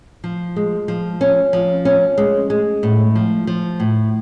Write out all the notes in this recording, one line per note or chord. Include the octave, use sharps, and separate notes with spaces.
F3
G#3
F3
C#4
F3
C#4
G#3
G#3
A2
F3
F3
A2